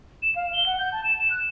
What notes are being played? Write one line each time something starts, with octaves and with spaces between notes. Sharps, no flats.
E7
F5
G7
F#5
G6
A5
E7
E7
F#6